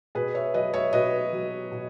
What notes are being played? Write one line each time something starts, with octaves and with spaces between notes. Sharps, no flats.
B2 G#4 B4
C#5 E5
F#3 B4 D#5
C#5 E5
B2 B4 D#5
F#3
B2